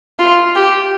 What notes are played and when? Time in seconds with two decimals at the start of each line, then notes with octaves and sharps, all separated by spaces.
0.19 F4
0.55 G4